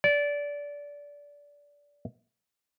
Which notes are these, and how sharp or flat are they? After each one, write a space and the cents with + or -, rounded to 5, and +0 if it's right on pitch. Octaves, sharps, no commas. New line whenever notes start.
D5 -20